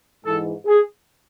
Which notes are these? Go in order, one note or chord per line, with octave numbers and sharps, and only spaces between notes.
G#2 E3 A4
G#4